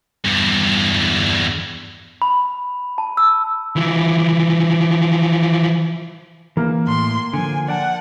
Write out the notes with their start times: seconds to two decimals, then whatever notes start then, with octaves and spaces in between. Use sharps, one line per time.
0.25 E2 G2
2.22 B5
2.98 A5
3.17 E6
3.76 E3 F3
6.57 E3 A#3
6.87 A2 C6
7.33 D3 F3 G#5
7.68 D5 F#5 G5 A5